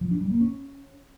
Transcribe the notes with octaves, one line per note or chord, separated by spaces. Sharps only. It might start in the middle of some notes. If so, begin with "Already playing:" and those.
F3
D4
G3
A#3
C#4